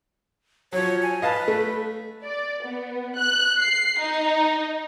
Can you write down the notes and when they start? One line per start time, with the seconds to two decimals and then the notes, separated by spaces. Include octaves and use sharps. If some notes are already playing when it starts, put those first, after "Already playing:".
0.73 F3 F#3 C#5
1.02 G#5
1.22 B4 D#5 F5 A5
1.48 A3
2.24 D5
2.64 B3
3.17 F#6
3.61 C7
4.00 D#4